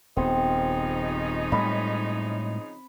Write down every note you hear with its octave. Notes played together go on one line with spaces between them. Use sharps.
D#1 C#3 F3 B3 C4 D#4
A2 G3 G#3 B5